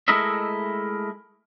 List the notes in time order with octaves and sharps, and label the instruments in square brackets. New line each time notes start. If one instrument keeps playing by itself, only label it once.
[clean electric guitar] G#3 A3 E4 A#4 D#5 E5